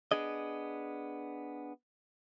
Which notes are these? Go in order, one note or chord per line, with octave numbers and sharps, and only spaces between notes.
B3 D4 G#4 D#5